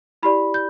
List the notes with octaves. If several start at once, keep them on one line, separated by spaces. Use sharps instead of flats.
E4 G4 D5 B5
G6